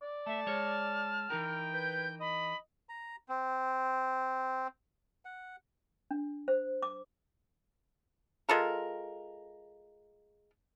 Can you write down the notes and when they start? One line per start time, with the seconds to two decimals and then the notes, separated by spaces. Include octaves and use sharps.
0.02 D5
0.26 A3 E5 A5
0.47 G#3 C#5 F6
1.30 E3 D#4 A#4 G5
1.73 B4 G6
2.20 D#5 B5
2.89 A#5
3.29 C4
5.25 F#5
6.11 D4
6.48 C5
6.83 D6
8.49 G#3 F4 A4 A#4